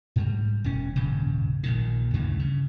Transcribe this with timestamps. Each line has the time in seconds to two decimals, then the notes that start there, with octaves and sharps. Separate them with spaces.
0.16 G#2 G3
0.64 E1 C#4
0.96 D#1 G#1 G2 C#3
1.63 A#1 A#2 D#3
2.14 D2 G2 C#3 E3
2.39 C#3